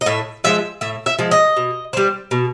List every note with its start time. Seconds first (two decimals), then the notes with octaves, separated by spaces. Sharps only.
0.01 D#5
0.06 A2 E5
0.44 F3 G#3 E5
0.81 A2 E5
1.06 E5
1.19 F3 G#3
1.31 D#5
1.57 B2
1.93 G3 C4
2.31 B2